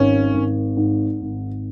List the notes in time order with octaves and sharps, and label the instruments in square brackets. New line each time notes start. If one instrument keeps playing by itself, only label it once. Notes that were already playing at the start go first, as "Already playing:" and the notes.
Already playing: [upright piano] G#1 [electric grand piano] C#4
[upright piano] G#1
G#2
G#1